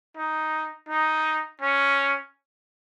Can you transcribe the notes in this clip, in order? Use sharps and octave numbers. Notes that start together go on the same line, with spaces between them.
D#4
D#4
C#4